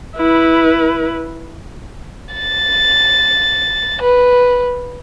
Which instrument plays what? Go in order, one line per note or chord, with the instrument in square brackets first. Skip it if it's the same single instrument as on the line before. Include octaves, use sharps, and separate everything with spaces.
[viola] E4 B4
[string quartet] A6
B4